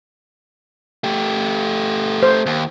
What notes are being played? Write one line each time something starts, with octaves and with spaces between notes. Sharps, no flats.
A3 G4
C5
D#2